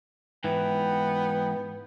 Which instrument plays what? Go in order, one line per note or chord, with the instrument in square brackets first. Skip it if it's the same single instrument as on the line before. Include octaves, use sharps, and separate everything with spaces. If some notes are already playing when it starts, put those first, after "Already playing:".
[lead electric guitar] G#2 E3 [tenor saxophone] B3 [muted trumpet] G5